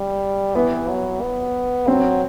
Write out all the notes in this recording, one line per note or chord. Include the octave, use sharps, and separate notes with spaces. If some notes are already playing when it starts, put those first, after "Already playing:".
Already playing: G3
E3 B3
F#3
B3
F#3 C4